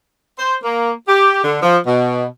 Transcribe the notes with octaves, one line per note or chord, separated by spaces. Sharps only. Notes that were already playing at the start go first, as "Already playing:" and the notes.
C5
A#3
G4
D3
F3
B2